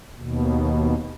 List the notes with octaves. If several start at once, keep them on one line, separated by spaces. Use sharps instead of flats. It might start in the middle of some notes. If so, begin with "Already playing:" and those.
D#2 B2